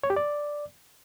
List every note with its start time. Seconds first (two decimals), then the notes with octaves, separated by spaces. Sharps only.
0.03 C#5
0.10 G4
0.16 D5